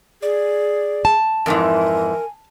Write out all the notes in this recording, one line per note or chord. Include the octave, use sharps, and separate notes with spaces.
G#4 D5
A5
F2 G#2 E3 A#4 G#5